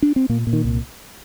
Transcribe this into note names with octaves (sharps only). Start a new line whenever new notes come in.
D4
C4
A#2 A#3
A#2
D#3
C2